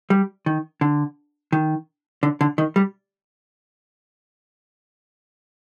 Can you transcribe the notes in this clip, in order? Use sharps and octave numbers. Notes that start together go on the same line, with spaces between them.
G3
D#3
D3
D#3
D3
D3
D#3
G3